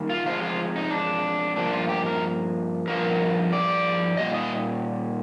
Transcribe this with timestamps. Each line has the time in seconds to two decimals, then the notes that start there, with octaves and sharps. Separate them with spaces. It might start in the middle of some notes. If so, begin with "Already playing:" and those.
Already playing: D#3 G3 A#3
0.09 F4
0.26 C3 F3 G#3 F4
0.43 F4
0.76 D#4
0.91 D4
1.56 G2 F3 A#3 D4
1.73 F4
1.89 G4
2.06 A#4
2.87 G2 F3 A#3 A#4
3.53 D5
4.17 A#2 G3 D#5
4.34 D#5